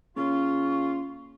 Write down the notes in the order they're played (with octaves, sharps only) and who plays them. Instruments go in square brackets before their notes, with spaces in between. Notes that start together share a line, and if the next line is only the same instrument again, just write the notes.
[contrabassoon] C#3 [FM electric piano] A#3 C#4 [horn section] F4 [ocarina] C#6